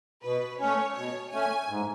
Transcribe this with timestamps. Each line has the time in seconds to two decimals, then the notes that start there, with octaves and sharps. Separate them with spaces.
0.24 B2 B4
0.60 A3 C#4 C#5
0.97 B2 C#5
1.33 A3 C#4 G#5
1.69 G#2